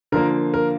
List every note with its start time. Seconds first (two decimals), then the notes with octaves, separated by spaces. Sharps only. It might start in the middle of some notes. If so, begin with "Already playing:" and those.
0.12 D3 F3 A#3 A#4
0.54 A#4